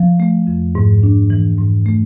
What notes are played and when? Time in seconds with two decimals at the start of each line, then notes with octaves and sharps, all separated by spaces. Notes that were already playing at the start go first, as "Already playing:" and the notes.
Already playing: F3
0.20 A3
0.47 F2
0.75 G#2
1.03 D4
1.30 E3
1.58 G#2
1.86 A3